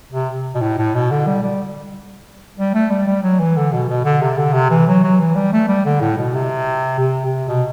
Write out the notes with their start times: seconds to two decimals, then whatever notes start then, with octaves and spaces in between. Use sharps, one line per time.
0.12 C3
0.55 B2
0.62 A2
0.78 A2
0.95 B2
1.11 D3
1.27 G3
1.43 G3
2.58 G3
2.74 A3
2.90 G3
3.07 G3
3.23 F#3
3.40 E3
3.57 D3
3.73 B2
3.89 B2
4.05 D3
4.22 C3
4.38 D3
4.54 C3
4.71 E3
4.87 F#3
5.04 F#3
5.20 E3
5.35 G3
5.53 A3
5.69 G3
5.86 D3
6.01 A2
6.17 B2
6.34 C3
6.99 C3
7.25 C3
7.48 B2